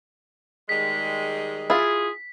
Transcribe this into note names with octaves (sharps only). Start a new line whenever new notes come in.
D#3 G3 G#3 B6
E4 F4 G#4